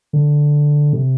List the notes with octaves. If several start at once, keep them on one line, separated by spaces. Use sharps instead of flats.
D3
C3